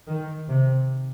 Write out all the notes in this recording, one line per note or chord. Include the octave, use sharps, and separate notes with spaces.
D#3
C3